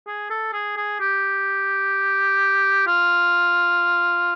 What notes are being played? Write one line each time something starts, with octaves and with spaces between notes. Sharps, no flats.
G#4
A4
G#4
G#4
G4
F4